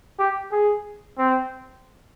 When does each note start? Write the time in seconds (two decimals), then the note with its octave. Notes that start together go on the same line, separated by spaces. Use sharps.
0.19 G4
0.52 G#4
1.18 C4